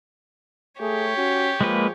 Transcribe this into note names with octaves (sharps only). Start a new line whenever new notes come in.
A3 G4 G#4 C#5
C#4 F#4
F3 G#3 A#3 G#4 B4